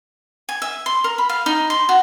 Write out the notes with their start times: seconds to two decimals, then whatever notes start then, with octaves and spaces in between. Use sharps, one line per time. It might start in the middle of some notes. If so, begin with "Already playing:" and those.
0.49 G#5
0.62 E5
0.86 C6
1.04 A#4
1.18 B5
1.29 F5
1.46 D#4
1.70 C6
1.89 F#4